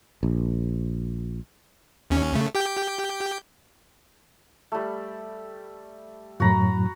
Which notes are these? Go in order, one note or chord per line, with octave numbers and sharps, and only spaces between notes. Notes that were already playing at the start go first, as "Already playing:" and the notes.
A#1
D#2 C#4
C#3 A3
G4 G5 G6
G3 A3
F#2 A2 F#3 F#4 A#5 B5